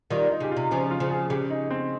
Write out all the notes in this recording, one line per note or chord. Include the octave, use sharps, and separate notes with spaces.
D#3 G3 F4
D#4
C#3 G4
F4
C3
C#3 F3 C#4
F4
C#3 F3
G#4
C#3 G4
D#4
C4